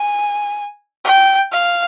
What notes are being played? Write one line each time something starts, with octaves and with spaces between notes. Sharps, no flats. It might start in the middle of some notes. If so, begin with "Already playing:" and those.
Already playing: G#5
G5
F5